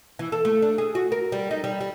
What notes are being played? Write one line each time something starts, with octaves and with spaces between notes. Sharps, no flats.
E3
A4
A3
D4
G#4
F#4
A#4
G3
D#4
G3
G3